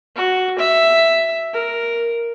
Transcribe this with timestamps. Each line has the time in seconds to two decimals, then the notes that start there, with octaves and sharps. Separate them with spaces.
0.16 F#4
0.59 E5
1.53 A#4